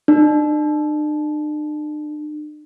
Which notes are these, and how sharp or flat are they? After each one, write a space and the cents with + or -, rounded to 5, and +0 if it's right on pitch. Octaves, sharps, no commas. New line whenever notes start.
D4 +45